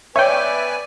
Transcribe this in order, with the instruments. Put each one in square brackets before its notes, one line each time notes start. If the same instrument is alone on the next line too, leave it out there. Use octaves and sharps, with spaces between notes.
[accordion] B3 B4 G#5 [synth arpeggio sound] C#5 G5 [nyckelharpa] D5 [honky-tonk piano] E5